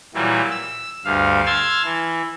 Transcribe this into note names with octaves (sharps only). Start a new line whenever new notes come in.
A#2 E3 F#3 G3
E6
D2 G2 F5
A5 C6 E6 F6 G#6 A6
E3